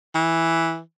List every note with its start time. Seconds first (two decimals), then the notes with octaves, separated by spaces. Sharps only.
0.15 E3